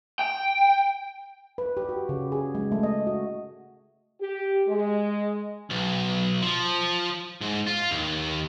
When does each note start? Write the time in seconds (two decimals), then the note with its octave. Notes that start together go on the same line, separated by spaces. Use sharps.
0.19 G5
1.58 B4
1.77 G4
1.89 F#4
2.09 C#3
2.32 G#4
2.55 G#3
2.72 A3
2.83 D#5
3.07 F#4
4.21 G4
4.68 G#3
5.70 B1
6.42 F3
7.41 G#2
7.67 F4
7.91 D#2